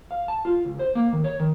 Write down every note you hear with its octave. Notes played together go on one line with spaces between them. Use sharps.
F5
A5
F4
C#2
C5
A#3
D#3
C#5
D#3